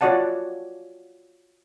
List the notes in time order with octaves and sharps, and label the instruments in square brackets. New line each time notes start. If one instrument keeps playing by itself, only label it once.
[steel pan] F4 F#4 C#5 D5 F#5 A5